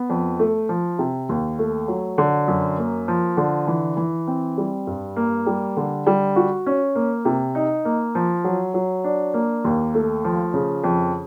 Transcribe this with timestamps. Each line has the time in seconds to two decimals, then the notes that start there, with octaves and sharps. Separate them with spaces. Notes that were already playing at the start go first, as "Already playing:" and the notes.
Already playing: B3
0.10 F2
0.39 A3
0.69 F3
0.99 C3
1.29 D#2
1.59 A3
1.88 F#3
2.18 D3
2.48 F#2
2.78 A#3
3.08 F3
3.37 D3
3.67 E3
3.97 E3
4.27 C4
4.58 G3
4.87 G2
5.16 A#3
5.47 G3
5.77 D3
6.07 G3
6.36 F#4
6.66 C#4
6.95 A#3
7.25 C3
7.55 D#4
7.85 A#3
8.15 F3
8.44 F#3
8.74 F#3
9.04 D4
9.34 A#3
9.65 D#2
9.94 A3
10.24 F3
10.54 C#3
10.84 F2